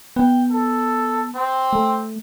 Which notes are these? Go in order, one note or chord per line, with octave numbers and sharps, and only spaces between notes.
B3 G5
A4
C4
A3